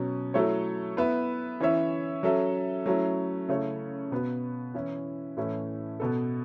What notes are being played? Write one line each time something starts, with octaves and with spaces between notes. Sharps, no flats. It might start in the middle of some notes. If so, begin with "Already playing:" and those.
Already playing: B2 F#3 C#4
F#3 A3 E4 A4 C#5
B3 E4 B4 E5
E3 C#4 E4 C#5 E5
F#3 C#4 A4 E5
F#3 A3 C#4 E4
C#3 A3 E4 C#5
B2 B3 F#4 B4
E3 C#4 E4
A2 E3 A3 C#4 E4
B2 B3 A4